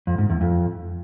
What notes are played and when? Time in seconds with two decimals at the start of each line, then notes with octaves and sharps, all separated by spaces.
0.07 F2
0.18 G#2
0.30 E2
0.41 F2